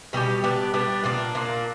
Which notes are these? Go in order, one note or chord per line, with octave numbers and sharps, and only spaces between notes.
B2 G3 C#4 G4
G3 B3 D4 G4
G3 B3 D4 G4
A#2 A#3 D4
A#2 A#3 D4